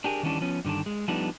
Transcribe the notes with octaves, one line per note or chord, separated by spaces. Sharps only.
D4 G4 G#4 A#4
D#3 E3 G3 C#4 D4
F3 B3 C#4
G2 D3 D#3 D4
G#3
F3 G3 A3 B3 D4 D#4